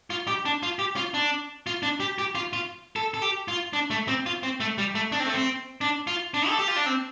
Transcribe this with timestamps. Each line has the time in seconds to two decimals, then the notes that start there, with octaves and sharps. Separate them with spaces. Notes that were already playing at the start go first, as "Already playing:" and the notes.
0.10 F4
0.27 G4
0.45 D4
0.63 F4
0.79 G4
0.96 F4
1.14 D4
1.67 F4
1.83 D4
2.00 G4
2.19 G4
2.35 F4
2.53 F4
2.96 A4
3.14 A4
3.22 G4
3.48 F4
3.73 D4
3.90 A3
4.08 C4
4.26 F4
4.43 C4
4.60 A3
4.78 G3
4.95 A3
5.12 D4
5.20 C4
5.26 A3
5.34 C4
5.81 D4
6.07 F4
6.34 D4
6.48 A4
6.59 G4
6.68 F4
6.76 D4
6.86 C4